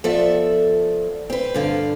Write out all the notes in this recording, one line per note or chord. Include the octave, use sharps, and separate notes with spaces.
F3 B3 A4 D5 E5
C4 B4
G2 D3 F5